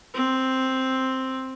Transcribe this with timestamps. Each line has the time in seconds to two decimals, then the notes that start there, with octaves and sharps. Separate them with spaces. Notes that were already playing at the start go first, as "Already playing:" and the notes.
0.14 C4